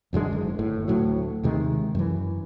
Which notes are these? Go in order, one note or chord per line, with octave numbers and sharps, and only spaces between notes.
E1 F#2 D3 G#3
F#1
G1 A2
D2 A2 F#3
D#2 C3 D#3 G#3
F#2 E3